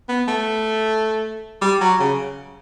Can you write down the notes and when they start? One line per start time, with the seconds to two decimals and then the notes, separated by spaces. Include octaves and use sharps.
0.09 B3
0.28 A3
1.62 G3
1.81 F#3
2.00 C#3